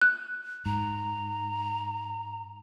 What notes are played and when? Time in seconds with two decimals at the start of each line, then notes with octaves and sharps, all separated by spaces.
0.02 F#6
0.66 G#2 A#5